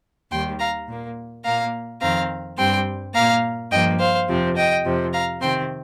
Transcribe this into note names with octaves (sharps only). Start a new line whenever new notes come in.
D#2 D#3 G3 G5 C6
F5 A#5
A#2 A#3
A#2 A#3 F5 A#5
F2 D#3 C4 F5 A#5
G2 G3 C4 G5 C6
A#2 A#3 F5 A#5
G2 F3 A#3 D#5 G5
C5 F5
F2 C3 F3 C4
D#5 G5
F2 C3 F3
F5 A#5
C3 D#3 C4 G5 C6